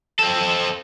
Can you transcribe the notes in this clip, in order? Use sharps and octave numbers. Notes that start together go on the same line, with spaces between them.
C4 A4